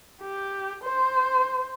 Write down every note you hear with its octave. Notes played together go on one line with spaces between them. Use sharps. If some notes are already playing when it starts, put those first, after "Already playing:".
G4
C5